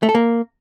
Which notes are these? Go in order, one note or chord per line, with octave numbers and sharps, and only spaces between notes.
A3
A4
A#3